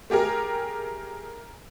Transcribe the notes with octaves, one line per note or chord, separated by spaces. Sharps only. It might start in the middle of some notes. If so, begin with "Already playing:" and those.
A3 G4 G#4 A#4